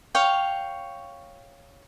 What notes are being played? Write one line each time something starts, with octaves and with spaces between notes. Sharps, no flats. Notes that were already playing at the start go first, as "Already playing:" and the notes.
C#5 F5 G5